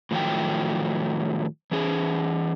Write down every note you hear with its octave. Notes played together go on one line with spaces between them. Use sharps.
A2 D#3 F3 F#3 A3 G5
E3 C#4 G#4